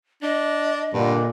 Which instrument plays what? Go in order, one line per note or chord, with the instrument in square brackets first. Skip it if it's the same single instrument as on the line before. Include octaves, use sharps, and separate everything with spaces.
[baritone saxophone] D4 [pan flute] D#5
[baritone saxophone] G2 [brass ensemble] A#2 D3